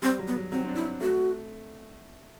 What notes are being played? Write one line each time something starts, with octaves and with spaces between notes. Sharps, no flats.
G3 C4
F#3
B3
F#3
F#3 C4
C4
D4
E4
A3 F#4